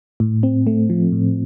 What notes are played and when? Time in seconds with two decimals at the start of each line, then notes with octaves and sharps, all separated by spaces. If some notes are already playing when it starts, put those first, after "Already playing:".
0.20 A2
0.43 C4
0.67 A3
0.90 F3
1.12 A2